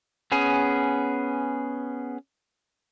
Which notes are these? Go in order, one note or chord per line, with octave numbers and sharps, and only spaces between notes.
B3 C#4 G#4